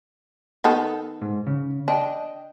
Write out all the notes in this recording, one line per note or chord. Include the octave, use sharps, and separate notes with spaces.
D#3 B3 A4
G#2
C#3
D4 D#5 G5